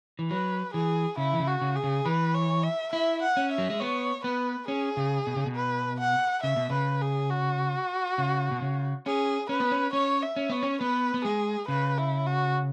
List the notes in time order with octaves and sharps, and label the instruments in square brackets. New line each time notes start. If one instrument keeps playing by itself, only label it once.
[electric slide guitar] E3
[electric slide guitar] F#3 [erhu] B4
[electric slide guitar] E3 [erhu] G#4
[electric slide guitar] C#3 [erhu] E4
[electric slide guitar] E3
C#3
[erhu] F#4
[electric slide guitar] C#3
[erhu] G#4
[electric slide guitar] C#3
[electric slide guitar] E3 [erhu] B4
[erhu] C#5
E5
[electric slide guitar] E4 [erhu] E5
[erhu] F#5
[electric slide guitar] C#4
[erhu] E5
[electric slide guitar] F#3
G#3
[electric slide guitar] B3 [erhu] C#5
[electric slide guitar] B3 [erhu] B4
[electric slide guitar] C#4 [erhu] G#4
[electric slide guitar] C#3
B2
C#3
B2
[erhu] B4
F#5
[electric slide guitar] C#3 [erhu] E5
[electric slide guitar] B2
[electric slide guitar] C#3 [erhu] B4
[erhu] G#4
F#4
[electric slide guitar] C#3
B2
C#3
[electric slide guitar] C#4 [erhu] G#4
[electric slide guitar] C#4 [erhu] B4
[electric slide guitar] B3
C#4
[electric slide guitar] C#4 [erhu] C#5
[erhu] E5
[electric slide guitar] C#4
[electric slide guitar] B3 [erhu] C#5
[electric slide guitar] C#4
[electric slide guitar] B3 [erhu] B4
[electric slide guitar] B3
[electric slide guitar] G#3 [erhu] G#4
[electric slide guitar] C#3 [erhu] B4
[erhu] E4
F#4